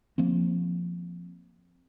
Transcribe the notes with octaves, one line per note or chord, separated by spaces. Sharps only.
F3 A#3 C4